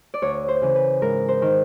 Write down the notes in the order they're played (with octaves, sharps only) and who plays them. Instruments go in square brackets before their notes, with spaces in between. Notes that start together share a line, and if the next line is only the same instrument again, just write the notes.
[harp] D5
D2 C#5
C5
C#3 E3
B4
G#2 A#4
C5
D#3